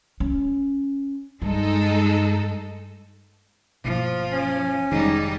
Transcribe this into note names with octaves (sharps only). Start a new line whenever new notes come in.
C#4
G2 G#3 D#4 A4
G1 B2 F3 A#3
C#4
F1 G#2 D#3 G3 D#4